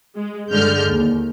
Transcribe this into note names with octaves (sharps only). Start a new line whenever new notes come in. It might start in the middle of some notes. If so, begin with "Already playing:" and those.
G#3
G2 D3 G#3 F6 G6
D#2